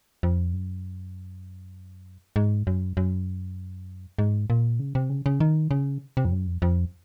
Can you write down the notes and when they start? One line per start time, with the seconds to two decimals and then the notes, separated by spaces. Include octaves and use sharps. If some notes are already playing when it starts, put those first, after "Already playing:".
0.23 F2
0.53 F#2
2.36 G#2
2.67 F#2
2.97 F#2
4.19 G#2
4.50 A#2
4.80 C#3
4.95 C3
5.10 C#3
5.26 C#3
5.40 D#3
5.71 C#3
6.17 C3
6.25 F2
6.32 F#2
6.47 F2
6.62 F2